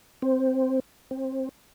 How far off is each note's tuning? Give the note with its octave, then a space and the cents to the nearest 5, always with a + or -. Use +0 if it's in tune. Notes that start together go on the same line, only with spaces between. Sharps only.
C4 +0
C4 +20